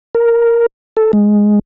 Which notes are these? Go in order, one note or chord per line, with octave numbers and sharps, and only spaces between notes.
A#4
A4
G#3